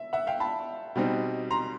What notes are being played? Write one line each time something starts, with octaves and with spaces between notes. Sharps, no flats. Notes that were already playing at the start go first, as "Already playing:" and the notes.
Already playing: E5
E5 F#5
F5 G5
A5 B5
B2 G3 C4 D#4
A#5 C6